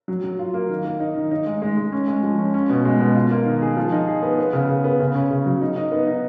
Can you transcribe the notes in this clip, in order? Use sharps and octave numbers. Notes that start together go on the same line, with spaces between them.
F#3
F#3
F4
A#3
D#3
A#3
D#4
D#3
D#4
G#3
G#3
G#3
C#4
G#3
F3
C#4
C#4
B2
G#3
B2
F4
A#3
D#3
G#4
F3
D#4
G#4
B3
B3
C#3
C#3
B3
C#3
C#4
C#3
F#3
D#4
D#4
B3
D#4